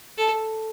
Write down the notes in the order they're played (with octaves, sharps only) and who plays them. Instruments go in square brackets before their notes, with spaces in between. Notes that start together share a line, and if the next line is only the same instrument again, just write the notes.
[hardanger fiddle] A4